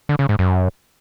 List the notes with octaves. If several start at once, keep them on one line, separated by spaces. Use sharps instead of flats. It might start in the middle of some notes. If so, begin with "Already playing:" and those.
D3
C#3
G#2
F#2